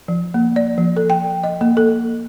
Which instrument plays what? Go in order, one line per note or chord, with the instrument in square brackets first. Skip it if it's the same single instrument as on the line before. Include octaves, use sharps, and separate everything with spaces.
[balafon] F3
A#3
D5
F3
A4
G5
D#5
A#3
A4